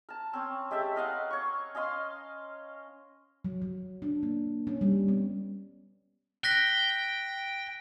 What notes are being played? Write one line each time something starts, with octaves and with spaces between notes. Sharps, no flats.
A#4 A5
C4 C#4
G#3 G4 A4 E5
A#4 D#5 F5 F#5
C#5 C#6
C#4 D#5 F5 C6
F#3
F#3
D4
A#3
C#4
G3
B3
G5 F#6 A#6 B6